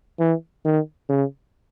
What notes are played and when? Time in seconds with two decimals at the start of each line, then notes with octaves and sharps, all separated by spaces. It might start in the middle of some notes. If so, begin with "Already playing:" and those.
0.20 E3
0.65 D#3
1.10 C#3